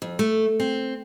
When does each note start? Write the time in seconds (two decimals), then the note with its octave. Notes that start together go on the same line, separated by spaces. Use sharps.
0.02 F2
0.19 A3
0.60 C4